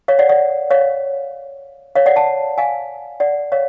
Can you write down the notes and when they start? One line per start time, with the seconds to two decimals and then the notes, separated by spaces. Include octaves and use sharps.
0.08 C#5 F5
0.19 D5 F#5
0.29 D5 F#5
0.70 C#5 F5
1.95 C#5 F5
2.06 D5 F#5
2.16 F#5 A5
2.58 F5 G#5
3.20 D5 F#5
3.52 C#5 F5